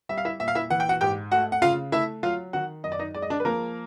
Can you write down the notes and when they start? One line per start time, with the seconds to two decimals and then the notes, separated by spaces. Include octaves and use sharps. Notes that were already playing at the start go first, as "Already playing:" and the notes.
0.09 G3 E5
0.18 F5
0.25 E4 E5
0.40 A#2 E5
0.48 F5
0.55 E4 E5
0.70 E3 F#5
0.80 G5
0.89 F#4 F#5
1.01 G#2 G4 G5
1.31 A3 F#4 F#5
1.52 F#5
1.62 C#3 F4 F5
1.92 A3 E4 E5
2.23 F#3 F4 F5
2.53 D#3 F#4 F#5
2.84 F#2 D#5
2.92 D5
2.99 D#4 D#5
3.15 G#3 D5
3.22 D#5
3.30 D4 D5
3.40 B4
3.45 F3 A#3 A#4